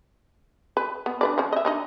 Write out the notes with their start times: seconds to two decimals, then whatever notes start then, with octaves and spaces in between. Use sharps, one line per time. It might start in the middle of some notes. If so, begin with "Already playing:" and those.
0.77 B4
1.06 B3
1.21 D4 B4 D5
1.38 F3 C#4
1.53 D#5 E5
1.65 D4 D#4 D#5